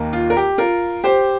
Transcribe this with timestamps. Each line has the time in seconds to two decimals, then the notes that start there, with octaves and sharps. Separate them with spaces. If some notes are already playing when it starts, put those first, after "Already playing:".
Already playing: D#2 D#3 A#3
0.13 F4
0.30 A#4
0.37 G4
0.58 F4 A#4
1.04 G4 C5